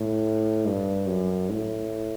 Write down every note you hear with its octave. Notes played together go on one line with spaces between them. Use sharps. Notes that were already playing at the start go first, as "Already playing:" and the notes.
Already playing: A2
G2
F#2
A2